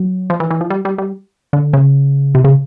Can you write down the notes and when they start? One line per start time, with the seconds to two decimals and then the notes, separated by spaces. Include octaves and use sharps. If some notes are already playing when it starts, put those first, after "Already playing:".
Already playing: F#3
0.30 F3
0.40 E3
0.50 E3
0.61 F3
0.70 G3
0.85 G3
0.98 G3
1.53 D3
1.73 C#3
2.35 C3
2.44 C#3